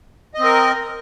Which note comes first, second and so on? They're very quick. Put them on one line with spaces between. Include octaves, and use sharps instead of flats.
D#5 C4 A#4